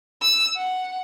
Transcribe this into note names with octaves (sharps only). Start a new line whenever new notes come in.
E6
F#5